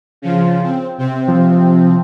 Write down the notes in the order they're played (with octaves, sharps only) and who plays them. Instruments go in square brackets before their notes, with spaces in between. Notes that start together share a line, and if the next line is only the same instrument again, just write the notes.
[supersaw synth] C#3 F3 F4
C4
C3 C4
[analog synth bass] F3